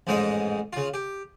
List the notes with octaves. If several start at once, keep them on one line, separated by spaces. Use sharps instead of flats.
A1 F2 G#2 G#3 D#4 D#5
C#3 F4
G4